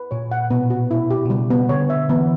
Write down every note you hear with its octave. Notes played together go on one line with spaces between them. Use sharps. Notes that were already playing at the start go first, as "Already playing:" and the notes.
Already playing: B4
A#2 C#5
F#5
B2 B3
F#4
E4
G4
B2
C#3 G3
B3
D3 C#5
E5
E3 B3